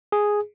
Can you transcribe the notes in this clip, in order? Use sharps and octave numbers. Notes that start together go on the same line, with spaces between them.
G#4